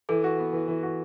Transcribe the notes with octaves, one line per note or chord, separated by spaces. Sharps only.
E3 A4
F#4
B3
E3
E3
F#4